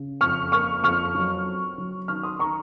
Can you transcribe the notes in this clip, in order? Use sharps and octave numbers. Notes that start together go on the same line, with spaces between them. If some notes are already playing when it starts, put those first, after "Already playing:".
Already playing: C#3
F2 C#6 F6
A#3 C#6 F6
F2 C#6 F6
F#3
C4
F#3
D#3 C#6 F6
C6 D#6
D#3 A#5 C#6